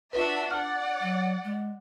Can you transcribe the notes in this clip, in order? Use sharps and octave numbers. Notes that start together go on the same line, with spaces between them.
D4 F4 F#4 B4 E5
D5 F#5 F6
F#3
G#3